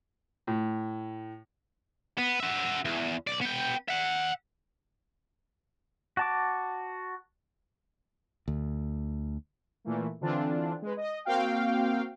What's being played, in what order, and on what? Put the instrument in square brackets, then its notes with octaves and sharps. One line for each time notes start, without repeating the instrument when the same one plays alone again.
[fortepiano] A2
[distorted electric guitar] B3
F#4 E5
E2
B1 D5
B3 G5
E5 F#5
[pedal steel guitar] F#4 A5 D6
[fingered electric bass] D2
[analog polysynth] A#2 E3 A3 A#3
D3 E3 C4 D4 F4
G#3 B4
D#5
A#3 C4 F#4 F5 G5